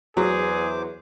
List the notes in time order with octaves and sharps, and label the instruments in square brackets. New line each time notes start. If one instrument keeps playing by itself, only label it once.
[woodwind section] E2 [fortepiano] F#3 [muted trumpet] G#4 [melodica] C5 D6